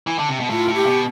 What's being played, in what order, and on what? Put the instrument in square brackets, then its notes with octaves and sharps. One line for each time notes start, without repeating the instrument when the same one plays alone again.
[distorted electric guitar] E3
D3
C3
B2
[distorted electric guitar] A2 [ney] F4
[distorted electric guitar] A2
[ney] G4
[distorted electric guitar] B2